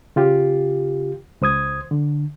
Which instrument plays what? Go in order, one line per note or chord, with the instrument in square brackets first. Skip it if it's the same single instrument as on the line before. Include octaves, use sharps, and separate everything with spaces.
[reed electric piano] C#3 F4 G4
C#2 C5 D#6 G#6
D3